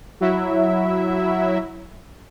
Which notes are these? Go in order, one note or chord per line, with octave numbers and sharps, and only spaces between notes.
F#3 E4 E5